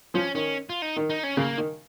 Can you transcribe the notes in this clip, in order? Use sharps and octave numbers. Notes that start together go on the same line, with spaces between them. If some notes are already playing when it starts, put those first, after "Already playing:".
F3 C#4
D#3 C#4
F4
D#4
D#3
D#4
C#4
C#3 A#3
D#3